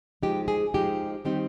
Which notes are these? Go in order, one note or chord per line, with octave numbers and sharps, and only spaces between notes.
F3 G#3 D#4 G4
G#4
F3 G#3 D#4 G4
D#3 G3 C4 D#4 G4